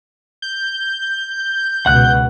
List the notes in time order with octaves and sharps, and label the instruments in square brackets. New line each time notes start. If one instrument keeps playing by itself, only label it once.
[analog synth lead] G6
[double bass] C#2 B2 [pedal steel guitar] F#5 F#6